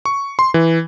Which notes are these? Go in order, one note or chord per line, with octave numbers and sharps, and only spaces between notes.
C#6
C6
E3